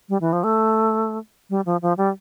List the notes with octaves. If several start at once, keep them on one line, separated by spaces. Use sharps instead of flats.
G3
E3
F3
A3
G3
F3
F3
G3